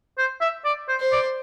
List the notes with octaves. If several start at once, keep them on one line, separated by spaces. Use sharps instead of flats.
C5
E5
D5
C5
C5
D5